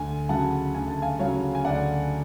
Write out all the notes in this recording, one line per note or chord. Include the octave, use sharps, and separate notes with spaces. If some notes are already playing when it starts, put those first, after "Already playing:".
Already playing: D2 G#5
C#3 F#3 F#5 A5
D2 G#5
A5
F5 G#5
C#3 F#3 C#5 F5
G#5
D2 D5 F#5